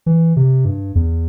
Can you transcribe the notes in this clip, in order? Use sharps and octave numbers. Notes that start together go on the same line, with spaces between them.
E3
C3
G2
E2